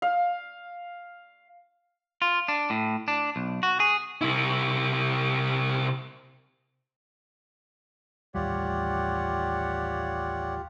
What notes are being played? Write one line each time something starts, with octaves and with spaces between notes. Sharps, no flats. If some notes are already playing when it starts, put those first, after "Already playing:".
F5
F4
D4
A2
D4
B1
F#4
G#4
C3 E4
A1 D#2 G3 F4 G4 C#5 D5 F#5